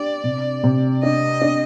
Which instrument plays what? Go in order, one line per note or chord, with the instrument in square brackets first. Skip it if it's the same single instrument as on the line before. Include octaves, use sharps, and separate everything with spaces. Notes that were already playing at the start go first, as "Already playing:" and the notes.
Already playing: [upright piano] D4 G4 [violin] D5
[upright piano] C3
C3
[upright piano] D4 [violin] D#5
[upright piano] D4